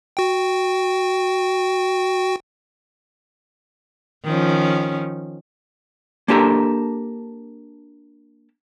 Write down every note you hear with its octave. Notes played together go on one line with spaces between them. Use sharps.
F#4 G5
D#3 F3 C#4
A#3 D4 G4 A4 A#4